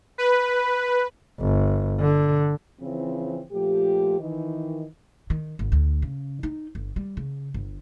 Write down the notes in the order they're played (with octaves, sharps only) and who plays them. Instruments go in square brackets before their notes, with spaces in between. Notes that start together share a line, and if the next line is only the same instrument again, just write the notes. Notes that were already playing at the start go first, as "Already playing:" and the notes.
[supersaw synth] B4
[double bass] G1
D3
[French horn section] C#3 E3 F3 C4
A#2 F3 A3 G4
D#3 E3
[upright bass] D#3
G#1
D2
C#3
D#4
G1
G3
C#3
G1